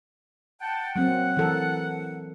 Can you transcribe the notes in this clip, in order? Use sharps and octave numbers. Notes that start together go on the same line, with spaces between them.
F#5 G5 A5
F#3 A#3 C4 F#5
E3 A4 A#4